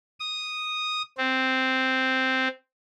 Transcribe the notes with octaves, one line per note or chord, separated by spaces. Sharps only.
D#6
C4